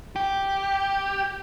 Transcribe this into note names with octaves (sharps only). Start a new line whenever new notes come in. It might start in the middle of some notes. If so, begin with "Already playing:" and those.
G4